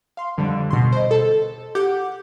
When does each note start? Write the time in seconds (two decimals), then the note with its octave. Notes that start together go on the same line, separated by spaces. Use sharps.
0.17 F5 C6
0.37 F2 D3 G3
0.71 B2 C6
0.92 C5 D#5
1.11 A4
1.75 G4 F#5 D6 G6